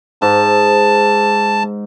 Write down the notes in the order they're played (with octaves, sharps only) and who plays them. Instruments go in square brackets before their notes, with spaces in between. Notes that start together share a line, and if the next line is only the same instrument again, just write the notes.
[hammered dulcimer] G#2 [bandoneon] A5